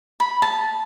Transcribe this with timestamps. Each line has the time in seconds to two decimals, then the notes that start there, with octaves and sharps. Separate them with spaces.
0.20 B5
0.42 A5